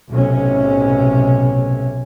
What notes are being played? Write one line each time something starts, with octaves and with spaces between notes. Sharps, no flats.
B1 A2 C3 C#4